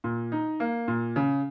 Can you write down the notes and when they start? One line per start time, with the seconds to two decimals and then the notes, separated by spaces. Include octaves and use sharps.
0.04 A#2
0.32 D#4
0.60 A#3
0.88 A#2
1.16 C#3